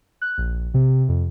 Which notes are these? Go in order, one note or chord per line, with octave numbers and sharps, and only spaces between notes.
F#6
A#1
C3
F2